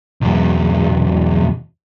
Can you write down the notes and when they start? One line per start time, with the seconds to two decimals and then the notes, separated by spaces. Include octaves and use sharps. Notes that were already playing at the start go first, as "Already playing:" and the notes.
0.21 B1 E2